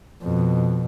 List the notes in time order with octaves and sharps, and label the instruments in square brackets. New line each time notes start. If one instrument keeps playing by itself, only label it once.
[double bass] F2 B2